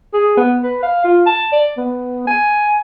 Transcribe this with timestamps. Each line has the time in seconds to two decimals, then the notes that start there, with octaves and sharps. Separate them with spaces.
0.13 G#4
0.37 B3
0.63 B4
0.83 F5
1.04 F4
1.26 A5
1.52 D5
1.77 B3
2.27 G#5